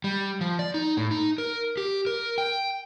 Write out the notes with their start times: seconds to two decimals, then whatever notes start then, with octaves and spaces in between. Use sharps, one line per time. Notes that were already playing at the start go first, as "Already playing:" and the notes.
0.04 G3
0.41 F3
0.59 D5
0.74 D#4
0.97 A2
1.11 D#4
1.38 A#4
1.77 G4
2.06 A#4
2.38 G5